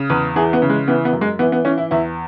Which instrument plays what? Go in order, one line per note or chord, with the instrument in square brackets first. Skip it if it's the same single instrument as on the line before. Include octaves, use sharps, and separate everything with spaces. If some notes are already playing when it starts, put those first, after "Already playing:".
Already playing: [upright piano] C#3
E2 B4
E3 G#4
B3
C#3
G#3
E3 B3
B3
F#2
G#3
E3 B3
B3
E3 C#4
E4
E2 E4